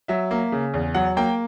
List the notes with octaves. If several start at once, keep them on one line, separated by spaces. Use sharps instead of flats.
F#3 E5
A#3
C#3
E2
F#3 F#5
A#3 G5